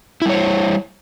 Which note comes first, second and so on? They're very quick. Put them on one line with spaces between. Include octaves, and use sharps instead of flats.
E4 G3 C#5 C5